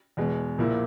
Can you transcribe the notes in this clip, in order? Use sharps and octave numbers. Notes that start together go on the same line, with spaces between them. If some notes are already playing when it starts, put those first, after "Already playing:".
E2 B2 G#3
A#1 A#2 A#3 E4